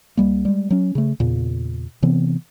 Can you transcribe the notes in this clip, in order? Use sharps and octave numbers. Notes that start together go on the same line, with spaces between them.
C2 G3 A#3
G3 G#3
F#3 C#4
C#3 A3
E2 A#2 C#3
C3 E3 B3 C4